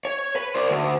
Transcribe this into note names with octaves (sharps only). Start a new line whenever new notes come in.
C#5
B4
C5 D5
D2